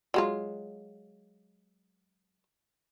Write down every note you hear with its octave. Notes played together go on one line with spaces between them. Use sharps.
F#3 G#3 F4